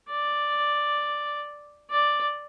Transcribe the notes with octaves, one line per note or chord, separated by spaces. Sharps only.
D5
D5